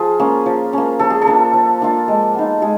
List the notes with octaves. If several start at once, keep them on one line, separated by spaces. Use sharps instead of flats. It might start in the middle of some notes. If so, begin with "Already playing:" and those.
Already playing: F3 F4 G#4
A#3 C#4
F3
A#3 C#4
F3 A4
G#4
A4
A#3 D4 F4
F3
A#3 D4 F4
G#3
B3 D#4
G#3 G#4